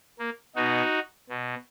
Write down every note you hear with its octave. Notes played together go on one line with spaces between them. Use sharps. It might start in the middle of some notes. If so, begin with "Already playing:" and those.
A#3
B2 D#4 F#4
B2